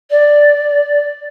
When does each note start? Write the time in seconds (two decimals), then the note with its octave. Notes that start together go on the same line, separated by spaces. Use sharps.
0.10 D5